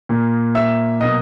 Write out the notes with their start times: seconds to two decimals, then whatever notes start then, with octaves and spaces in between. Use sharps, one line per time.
0.09 A#2 A#3
0.55 E5 E6
1.00 B2 F#3 A#3 D#5 D#6